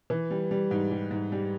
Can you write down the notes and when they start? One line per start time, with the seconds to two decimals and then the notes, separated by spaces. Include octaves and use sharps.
0.10 E3
0.31 G3
0.51 G3
0.71 G#2
0.91 G3
1.11 G#2
1.32 G3